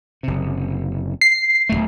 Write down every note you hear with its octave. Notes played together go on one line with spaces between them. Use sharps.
F#1 C3
C7
D1 C#2 A3